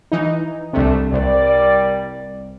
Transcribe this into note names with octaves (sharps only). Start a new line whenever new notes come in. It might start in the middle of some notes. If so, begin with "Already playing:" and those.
E3 D#4
C2 C3 A3 D4
C2 G3 A#4 D5